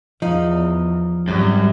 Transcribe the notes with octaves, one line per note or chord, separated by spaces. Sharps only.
E2 F3 D#4
G#1 F#2 G3